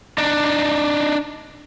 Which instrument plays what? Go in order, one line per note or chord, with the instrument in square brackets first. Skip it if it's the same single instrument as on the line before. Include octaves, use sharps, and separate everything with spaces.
[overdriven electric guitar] D4 D#4